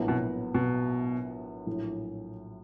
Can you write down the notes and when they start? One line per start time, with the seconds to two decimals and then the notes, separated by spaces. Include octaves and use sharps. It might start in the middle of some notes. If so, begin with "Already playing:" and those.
Already playing: A#1 A2 F#3 B3
0.08 B2
0.55 B2
1.66 A#1 A2 F#3